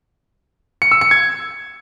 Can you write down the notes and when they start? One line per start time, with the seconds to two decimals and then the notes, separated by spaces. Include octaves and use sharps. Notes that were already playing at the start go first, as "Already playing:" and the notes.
0.82 C#7
0.92 E6
1.01 C#7
1.11 G#6